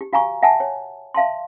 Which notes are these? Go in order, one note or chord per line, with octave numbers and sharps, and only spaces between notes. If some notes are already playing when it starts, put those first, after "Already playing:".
G4
F#4 F5 G#5 A#5 C#6
E5 F#5 G#5 A5
C#5
E5 F5 A5 C6